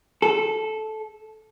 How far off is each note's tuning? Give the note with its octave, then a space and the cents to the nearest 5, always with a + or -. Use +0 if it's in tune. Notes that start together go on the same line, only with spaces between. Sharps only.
A4 -15